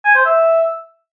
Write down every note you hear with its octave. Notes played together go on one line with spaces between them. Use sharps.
G#5
C5
E5